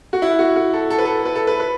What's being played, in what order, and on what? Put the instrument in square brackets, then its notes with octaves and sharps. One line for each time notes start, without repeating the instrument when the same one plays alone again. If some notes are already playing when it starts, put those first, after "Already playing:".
[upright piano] F#4
E4
F#4
F#4
A4
A4
B4
A4
B4
A4
B4
B4